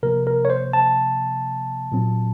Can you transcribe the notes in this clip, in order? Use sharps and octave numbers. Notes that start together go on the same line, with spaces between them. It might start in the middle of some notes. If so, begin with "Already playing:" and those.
C3 F3 A#3 A#4
A#4
C#5
C5
A5
A#2 F#3 C4